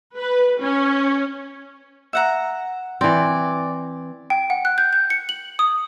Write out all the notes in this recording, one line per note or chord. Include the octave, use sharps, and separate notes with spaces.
B4
C#4
E5 F#5 A#5
E3 C4 D5
G5
F#5
F#6
G6
G6
C#7
F#7
D#6